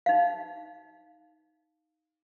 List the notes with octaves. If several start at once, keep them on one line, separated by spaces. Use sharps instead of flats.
D#4 F5